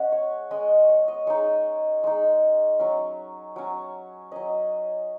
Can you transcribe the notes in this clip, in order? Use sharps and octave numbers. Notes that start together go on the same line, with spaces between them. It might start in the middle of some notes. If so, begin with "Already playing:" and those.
Already playing: G#3 C#4 F#5
C#5
G#3 C#4 D#5
C#5
D#5
G#3 D#4 C#5
G#3 D#4
F#3 C#4
F#3 C#4
F#3 C#4 D#5